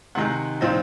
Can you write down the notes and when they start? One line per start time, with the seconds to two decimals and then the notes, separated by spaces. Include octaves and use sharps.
0.15 C3 D#3 G#3 D#4 F#5
0.61 A#2 F3 C4 D#4